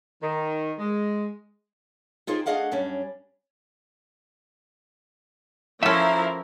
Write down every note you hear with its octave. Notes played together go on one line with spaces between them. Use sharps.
D#3
G#3
D#4 F4 G4 G#4 C5
A3 D4 G#4 D#5 F5 F#5
F#2 G3 C#4 D4
F3 A3 C#4 E4 A#4 E5